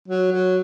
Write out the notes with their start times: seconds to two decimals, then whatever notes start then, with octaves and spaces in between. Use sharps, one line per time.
0.08 F#3
0.31 F#3